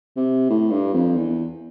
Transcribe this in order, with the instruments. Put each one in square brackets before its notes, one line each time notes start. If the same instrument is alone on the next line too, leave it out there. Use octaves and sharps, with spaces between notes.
[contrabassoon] C3
A2
G2
F2
E2